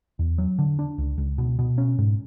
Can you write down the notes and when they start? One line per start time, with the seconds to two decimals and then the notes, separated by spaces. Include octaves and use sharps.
0.19 E2
0.38 F#3
0.59 D3
0.79 D4
0.98 C#2
1.18 C#2
1.38 B2
1.59 B2
1.78 C#4
1.98 G#2